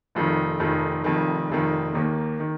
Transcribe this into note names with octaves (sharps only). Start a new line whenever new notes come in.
F1 F2 D#3
F1 F2 D#3
F1 F2 D#3
F1 F2 D#3
D#2 D#3 A#3
D#3